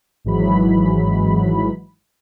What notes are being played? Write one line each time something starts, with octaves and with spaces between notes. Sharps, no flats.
G#1 G#2 E3 F#3 G#3 B5